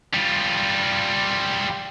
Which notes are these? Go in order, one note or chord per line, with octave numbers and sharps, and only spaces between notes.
G3 F4